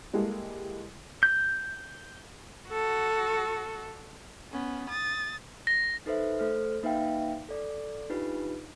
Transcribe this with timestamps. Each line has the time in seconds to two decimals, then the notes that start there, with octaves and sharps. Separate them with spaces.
0.13 G3 G#3 A#3 E4 G4 A4
1.23 G6
2.69 F#4 A4
4.52 B3 C#4
4.90 D#6 A6
5.67 A#6
6.06 D#4 A4 B4 C5 E5
6.39 A3 A4 C5 F6
6.83 A#3 D#4 B4 E5 F5 G5
7.48 A4 D5
8.10 D4 D#4 F4 G4 B4